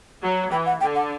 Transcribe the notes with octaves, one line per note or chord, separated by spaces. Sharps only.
F#3
E3 G5
F#5
D3 G5
F#5